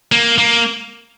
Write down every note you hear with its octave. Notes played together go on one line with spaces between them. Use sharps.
A#3
A#3